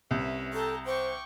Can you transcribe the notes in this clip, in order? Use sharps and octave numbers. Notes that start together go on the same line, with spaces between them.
C2 C#4 B4 E5
A4 G5 A5 A#5
C5 G5 C#6 D6